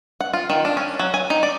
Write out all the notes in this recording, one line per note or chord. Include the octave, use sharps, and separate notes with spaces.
F#5
F4
D#3
D4
C#4
F#3
G#5
D#4
D5